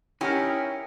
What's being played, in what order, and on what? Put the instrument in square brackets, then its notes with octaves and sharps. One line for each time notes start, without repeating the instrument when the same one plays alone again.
[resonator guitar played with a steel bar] C#4 [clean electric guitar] D#4 A#4 [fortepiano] E4 [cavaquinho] G4